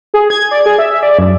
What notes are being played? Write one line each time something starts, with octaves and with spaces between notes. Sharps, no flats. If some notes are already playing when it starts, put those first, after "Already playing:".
G#4
G#6
D5
G#4
E5
D5
F#2